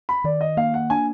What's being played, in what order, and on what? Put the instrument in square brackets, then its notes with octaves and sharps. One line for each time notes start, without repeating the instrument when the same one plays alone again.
[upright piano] B5
[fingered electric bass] D#3 [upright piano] D5
[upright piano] D#5
[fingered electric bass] A#3 [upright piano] F5
[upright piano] F#5
[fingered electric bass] D4 [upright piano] G#5